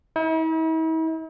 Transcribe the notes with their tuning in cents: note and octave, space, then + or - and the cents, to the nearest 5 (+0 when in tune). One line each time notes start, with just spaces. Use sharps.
E4 -45